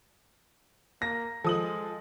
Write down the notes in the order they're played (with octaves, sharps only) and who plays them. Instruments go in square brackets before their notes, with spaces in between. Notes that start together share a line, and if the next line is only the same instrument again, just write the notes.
[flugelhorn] A#3 [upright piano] A#6
[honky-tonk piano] F3 D#6 F#7 [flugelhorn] G#3 [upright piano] A4